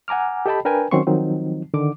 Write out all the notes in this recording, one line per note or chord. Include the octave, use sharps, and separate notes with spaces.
F#5 G#5 A#5 D6 F6
G4 A4 D#5 G5 A5 B5
D4 A#4 B4 G5 G#5
D#3 F#3 C4 C#4 C6 C#6
D#3 F3 F#3 C4 D#4
D3 D#3 D6